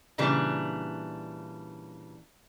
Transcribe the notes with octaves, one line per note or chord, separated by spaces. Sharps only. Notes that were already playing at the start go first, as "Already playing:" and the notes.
A#2 C#3 E3 G3 D4